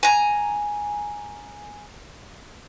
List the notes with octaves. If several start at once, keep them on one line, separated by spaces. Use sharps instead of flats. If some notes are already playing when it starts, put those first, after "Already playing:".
G#5 A#5